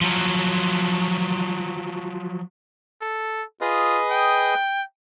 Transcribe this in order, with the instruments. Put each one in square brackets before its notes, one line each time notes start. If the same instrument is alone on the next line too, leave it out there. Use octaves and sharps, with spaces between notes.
[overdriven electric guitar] F3 F#3
[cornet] A4
[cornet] F4 [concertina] G#4 B4 D#5
[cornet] G5